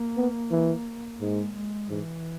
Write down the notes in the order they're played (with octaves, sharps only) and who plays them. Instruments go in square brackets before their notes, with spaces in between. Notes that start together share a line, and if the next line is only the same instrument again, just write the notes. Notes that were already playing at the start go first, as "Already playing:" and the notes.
Already playing: [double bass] A#3
[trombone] B3
E3
[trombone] G#2 [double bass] G#3
[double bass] G#3
[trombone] G#2 [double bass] E3